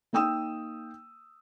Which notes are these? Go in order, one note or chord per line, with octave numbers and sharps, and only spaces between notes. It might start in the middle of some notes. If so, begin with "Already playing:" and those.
A#3 D#4 G5 D#6 E6 E7